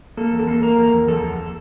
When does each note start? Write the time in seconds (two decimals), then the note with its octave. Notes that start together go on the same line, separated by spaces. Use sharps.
0.17 A#3 A4
0.32 E2
0.40 A4
0.47 A#3
0.63 A#3 A#4
0.78 E2
0.93 E2
1.08 E2 A4
1.23 E2